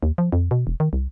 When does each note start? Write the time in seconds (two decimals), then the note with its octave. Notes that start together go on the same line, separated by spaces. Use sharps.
0.03 D#2
0.18 F3
0.32 F2
0.51 B2
0.67 E1
0.80 D#3
0.93 C2